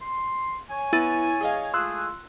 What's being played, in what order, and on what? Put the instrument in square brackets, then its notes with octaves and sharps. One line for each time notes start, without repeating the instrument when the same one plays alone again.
[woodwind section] C6
C#5 G#5
[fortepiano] B3 [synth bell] E4 A6 D#7
[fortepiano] G#4 D#5 F5
[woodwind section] G#3 A3 G#4 [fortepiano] F4 [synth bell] C6 E6 F#6